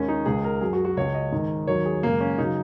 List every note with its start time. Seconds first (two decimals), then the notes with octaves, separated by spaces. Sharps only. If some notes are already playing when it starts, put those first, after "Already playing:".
Already playing: D#2 D#3 G#3 C#4
0.08 D#4
0.26 C#2 C#3 G#3 G#4
0.44 A#4
0.61 F#2 F#3 G#4
0.73 F#4
0.85 F#4
0.97 C#2 C#3 G#3 C#5
1.14 D#5
1.32 G#2 D#3 G#3
1.67 D#2 D#3 F#3 C#5
1.86 G#4
2.03 F#2 C#3 G#3 A#3
2.21 C#4
2.38 C#3 F#3 D#4